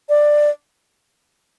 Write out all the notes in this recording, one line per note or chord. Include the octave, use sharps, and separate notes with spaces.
D5